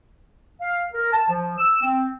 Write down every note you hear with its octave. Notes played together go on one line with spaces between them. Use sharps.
F5
A#4
A5
F3
E6
C4